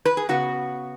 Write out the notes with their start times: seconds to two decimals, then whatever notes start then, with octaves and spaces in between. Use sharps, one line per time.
0.05 B4
0.17 G#4
0.29 C#3 B3 F#4